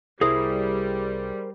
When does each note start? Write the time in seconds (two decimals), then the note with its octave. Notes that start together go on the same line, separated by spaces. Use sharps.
0.21 C2 G3 E4 G#4 A#4 C5 D#6